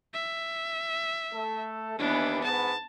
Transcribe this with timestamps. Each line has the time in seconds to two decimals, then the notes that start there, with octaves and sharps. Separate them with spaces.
0.14 E5
1.33 A3 A4
1.99 D#2 E3 B3 D4
2.43 G#2 B3 A5